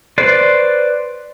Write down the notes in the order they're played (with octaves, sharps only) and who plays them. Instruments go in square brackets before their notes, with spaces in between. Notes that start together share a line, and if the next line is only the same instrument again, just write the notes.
[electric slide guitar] B4 C5 D5